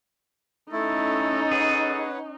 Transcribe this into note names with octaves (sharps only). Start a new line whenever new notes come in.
A3 C#4 D#4 E4 A4
G#4 B4 C#5 F#5